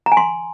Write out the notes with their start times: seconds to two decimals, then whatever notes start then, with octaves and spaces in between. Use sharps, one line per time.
0.06 A#5
0.12 G#5
0.17 C6